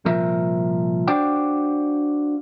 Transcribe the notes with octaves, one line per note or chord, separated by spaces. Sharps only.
C2 A#2 F3 C4 A#4 E5
D4 F#4 C5 D5 F5 G5